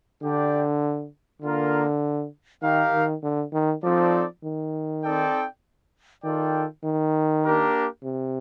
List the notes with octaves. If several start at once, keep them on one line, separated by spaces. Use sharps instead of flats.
D3 D4 G4 D5 G5
D3 A#3 F4 A#4
D#3 D#4 G4 A#4 F5
D#3
D3
D#3
F3 C4 D#4 A4 D5
D#3
C4 D#4 A4 D5 G5
D#3 F4 A4 D5 G5
D#3
A#3 D4 G4 A#4
C3